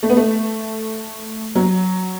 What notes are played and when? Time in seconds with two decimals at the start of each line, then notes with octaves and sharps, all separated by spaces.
0.03 A3
0.09 B3
0.17 A3
1.55 F#3